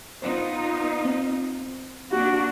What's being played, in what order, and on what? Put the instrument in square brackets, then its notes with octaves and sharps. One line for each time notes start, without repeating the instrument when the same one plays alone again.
[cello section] B3 D#4 F4 [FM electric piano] C5
[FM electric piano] C4
[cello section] A#3 D4 [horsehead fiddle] F#4